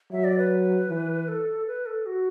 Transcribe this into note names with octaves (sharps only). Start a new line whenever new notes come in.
F#3 E5
D5
B4
E3
A4
B4
A4
F#4